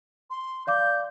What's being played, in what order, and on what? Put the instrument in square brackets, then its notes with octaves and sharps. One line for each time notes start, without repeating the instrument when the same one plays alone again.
[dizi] C6
[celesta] D5 F5 D6 [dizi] G6